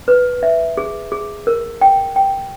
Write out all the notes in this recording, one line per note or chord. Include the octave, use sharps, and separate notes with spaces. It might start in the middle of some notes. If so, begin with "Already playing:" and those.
B4
E5
G#4
G#4
A#4
G5
G5